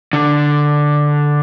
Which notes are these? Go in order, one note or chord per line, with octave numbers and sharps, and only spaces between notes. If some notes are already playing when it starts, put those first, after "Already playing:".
D3